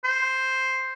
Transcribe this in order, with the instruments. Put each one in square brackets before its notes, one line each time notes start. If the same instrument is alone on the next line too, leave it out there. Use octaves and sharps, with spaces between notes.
[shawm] C5